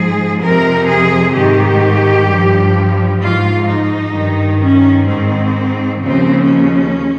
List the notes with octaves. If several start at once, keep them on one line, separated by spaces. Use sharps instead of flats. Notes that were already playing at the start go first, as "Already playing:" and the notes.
Already playing: G#2 F3 G#4
F2 C3 F3 A#4
G#4
G#2 D#3 G4
G2 F3
G#2 F3 F4
D#4
G2 D#3
C#4
G#2 D#3 C4
D#2 C#3 F3 C4
C#4